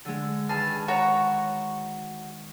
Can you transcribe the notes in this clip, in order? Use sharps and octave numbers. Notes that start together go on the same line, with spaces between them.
D3 G#3
D#3 G#4 B4 A5 F6
F#4 C#5 A#5